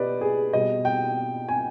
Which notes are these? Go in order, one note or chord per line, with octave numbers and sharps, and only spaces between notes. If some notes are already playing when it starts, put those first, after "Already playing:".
Already playing: B2 G4 B4 D5 D#5
G#4
B2 G3 D#5
G5
G#5